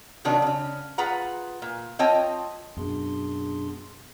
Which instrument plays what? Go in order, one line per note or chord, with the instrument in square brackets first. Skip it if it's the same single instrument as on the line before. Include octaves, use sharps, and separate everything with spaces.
[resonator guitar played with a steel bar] C3 D#3 F#3 D4
C#3 C#4
F4 G#4 B4 F#5 A#5
A#2
C4 F4 C#5 D#5 G5 A5
[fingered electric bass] F#2 B2 [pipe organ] D4 G#4 C6